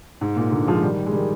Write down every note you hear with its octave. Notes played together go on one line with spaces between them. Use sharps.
G#2
A#2
A#2 D3
F3 G#3
D#3 G3
G#3
D#3 G3